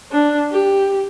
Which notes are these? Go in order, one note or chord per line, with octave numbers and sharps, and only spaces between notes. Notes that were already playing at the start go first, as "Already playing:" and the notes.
D4
G4